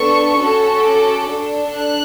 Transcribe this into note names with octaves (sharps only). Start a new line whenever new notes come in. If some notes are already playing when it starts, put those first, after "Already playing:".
Already playing: B3 D4 A4 C#6
C#4 F#4 A4
D6
D4 A4
F#6